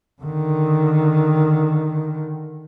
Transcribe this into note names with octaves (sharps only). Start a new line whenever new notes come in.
D3 D#3